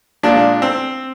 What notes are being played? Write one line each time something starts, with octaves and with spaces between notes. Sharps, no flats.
A#2 F3 G#3 D4
C4